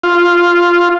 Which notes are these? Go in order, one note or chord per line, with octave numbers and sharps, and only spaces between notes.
F4